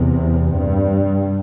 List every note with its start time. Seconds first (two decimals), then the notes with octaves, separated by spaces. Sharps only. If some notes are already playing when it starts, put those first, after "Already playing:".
Already playing: E2 C3
0.52 G2